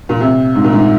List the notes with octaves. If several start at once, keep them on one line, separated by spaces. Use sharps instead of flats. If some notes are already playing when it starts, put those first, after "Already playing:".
A#2
C3
G#2
A#2
G#2